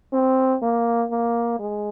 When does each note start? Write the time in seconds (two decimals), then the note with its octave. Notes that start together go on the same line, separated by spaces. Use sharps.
0.13 C4
0.62 A#3
1.11 A#3
1.59 G#3